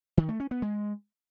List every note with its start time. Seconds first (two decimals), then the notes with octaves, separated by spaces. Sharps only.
0.17 D#3
0.29 A3
0.40 C#4
0.51 B3
0.62 G#3